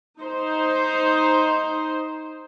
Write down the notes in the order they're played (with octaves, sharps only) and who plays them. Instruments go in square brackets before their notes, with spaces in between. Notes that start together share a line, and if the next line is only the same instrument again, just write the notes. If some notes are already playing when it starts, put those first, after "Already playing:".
[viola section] D#4 C5